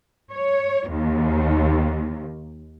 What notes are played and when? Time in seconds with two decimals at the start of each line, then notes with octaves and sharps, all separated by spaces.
0.32 C#5
0.89 D#2